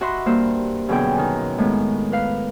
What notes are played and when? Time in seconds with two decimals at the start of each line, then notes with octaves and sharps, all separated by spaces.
0.01 F#4 D#5 E5 B5 C6 F#6
0.26 G2 A#3 C5 E6
0.89 F#2 B2 D3 B3 G#4 G5
1.18 D#3 D#4
1.58 A2 D#3 G#3 B3
2.12 B4 F5